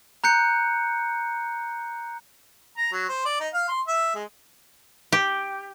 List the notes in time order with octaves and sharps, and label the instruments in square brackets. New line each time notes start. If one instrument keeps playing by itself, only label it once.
[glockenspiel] A#5 F#6 G6 C#7
[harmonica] A#5
F#3
C5
D5
D#4
F5
C6
E5
G#3
[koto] G4